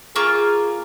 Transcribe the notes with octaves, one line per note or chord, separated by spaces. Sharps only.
A#3 F4 G#4 C#6